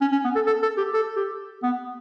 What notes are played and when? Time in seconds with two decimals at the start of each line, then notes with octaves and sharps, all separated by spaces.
0.01 C#4
0.12 C#4
0.24 B3
0.35 A4
0.47 A4
0.63 A4
0.77 G4
0.94 A4
1.16 G4
1.63 B3